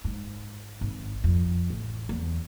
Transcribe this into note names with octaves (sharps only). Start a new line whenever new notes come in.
G#2
G#1
F2
A1
E2